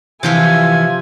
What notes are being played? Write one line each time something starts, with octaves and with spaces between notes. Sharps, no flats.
C3 E3 F3 E4 F4 G#5